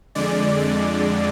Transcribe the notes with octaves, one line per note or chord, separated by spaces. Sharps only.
F2 D3 G#3 D5
D5